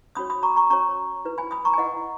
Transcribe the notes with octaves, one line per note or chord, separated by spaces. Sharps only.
C#4 F#4 C#5 B5 D#6
B5 D#6
A#5 C#6
A#5 C#6
C#4 F#4 C#5 A#5 C#6
E4 B4
G#5 B5
B5 D#6
A#5 C#6
G#5
E4 B4 D#5 F#5